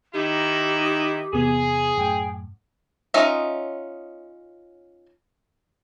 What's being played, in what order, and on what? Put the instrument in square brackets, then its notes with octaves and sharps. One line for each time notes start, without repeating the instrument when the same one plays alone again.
[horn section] D#3 D#4 E4 [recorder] G4
[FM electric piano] D#6 B6
[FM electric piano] E2 C3 B3 [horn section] G#4
[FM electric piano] F#2 A2 [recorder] G5
[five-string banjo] C#4 D#4 F4 D#5 E5